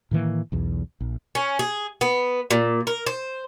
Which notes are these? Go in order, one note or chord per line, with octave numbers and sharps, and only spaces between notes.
A2 D#3 E3 A#3
B1 E2
A#1
C#4
G#4
B3
A#2
A#4
C5